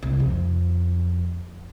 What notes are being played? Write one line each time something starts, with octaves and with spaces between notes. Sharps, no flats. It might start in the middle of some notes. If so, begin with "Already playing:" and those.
C2
F2